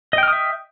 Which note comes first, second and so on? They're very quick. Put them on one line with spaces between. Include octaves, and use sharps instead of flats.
D#5 G5 F6 D#6 E5